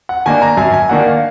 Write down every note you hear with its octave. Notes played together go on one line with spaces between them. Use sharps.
F#5
D#3 A#3 D4 G#5
A#5
F#2 G#5
G#5
D#3 A#3 D4 F#5
F5